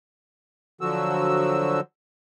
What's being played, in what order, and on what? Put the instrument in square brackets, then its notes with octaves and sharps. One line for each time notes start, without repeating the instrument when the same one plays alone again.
[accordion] D3 F3 F#3 F#4 E6